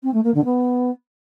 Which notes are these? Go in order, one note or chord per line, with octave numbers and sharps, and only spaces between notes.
C4
A3
A#3
D3
B3